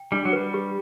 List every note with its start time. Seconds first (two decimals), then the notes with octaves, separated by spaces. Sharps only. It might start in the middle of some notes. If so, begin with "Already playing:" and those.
Already playing: G5
0.12 G3 D4
0.25 F#3
0.33 G3 B4
0.54 G4